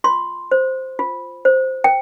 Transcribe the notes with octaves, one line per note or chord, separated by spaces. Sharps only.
F4 C6
C5
F4
C5
G5